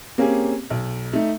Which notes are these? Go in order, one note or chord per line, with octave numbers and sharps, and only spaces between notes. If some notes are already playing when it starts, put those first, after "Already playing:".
A#3 C4 C#4 G4 G#4
B1
A3 D#4